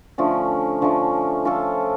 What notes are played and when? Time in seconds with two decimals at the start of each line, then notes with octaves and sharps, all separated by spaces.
0.18 D3 F3 A3 C#4
0.82 D3 F3 A3 C#4
1.45 F3 C#4 F4 A4